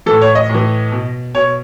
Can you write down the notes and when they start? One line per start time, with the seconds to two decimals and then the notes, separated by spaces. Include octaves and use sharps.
0.06 A2 E3 A4
0.22 C#5
0.35 D#5
0.49 A2 E3
0.92 B2
1.35 B2 C#5